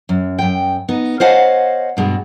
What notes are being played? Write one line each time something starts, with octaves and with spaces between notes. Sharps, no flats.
F#2
F#2 G5
B3 D#4
C5 C#5 D#5 F5 F#5 A5
G2 B2 G#3 D4